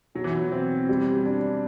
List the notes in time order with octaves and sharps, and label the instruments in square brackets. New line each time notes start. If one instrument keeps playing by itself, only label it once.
[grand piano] B2 [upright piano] F#3
[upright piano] E3
F#3
[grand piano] C4
G3
D4